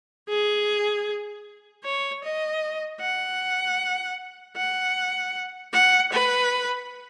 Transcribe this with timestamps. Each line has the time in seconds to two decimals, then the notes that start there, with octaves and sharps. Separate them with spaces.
0.29 G#4
1.84 C#5
2.24 D#5
3.01 F#5
4.56 F#5
5.73 F#5
6.12 B4